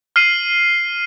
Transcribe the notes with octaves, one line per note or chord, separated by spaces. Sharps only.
F6 C7 D#7 F#7